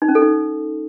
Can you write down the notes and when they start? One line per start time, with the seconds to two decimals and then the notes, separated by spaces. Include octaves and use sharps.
0.02 D#4
0.08 C#4
0.15 A4
0.22 D#4